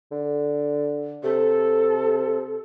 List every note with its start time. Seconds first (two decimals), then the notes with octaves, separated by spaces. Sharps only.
0.12 D3
1.24 C3 A4